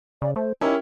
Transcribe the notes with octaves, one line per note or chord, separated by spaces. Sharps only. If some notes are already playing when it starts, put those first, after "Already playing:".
C#3 D5
A3 C5
C#4 D#4 E4 G4 A#4